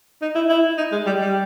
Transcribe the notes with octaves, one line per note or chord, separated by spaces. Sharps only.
D#4
E4
E4
D#4
G#3
G3
G3